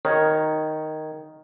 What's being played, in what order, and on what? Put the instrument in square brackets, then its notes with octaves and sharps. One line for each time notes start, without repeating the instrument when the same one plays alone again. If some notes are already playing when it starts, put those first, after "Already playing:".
[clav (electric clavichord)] D#3 [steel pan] C#5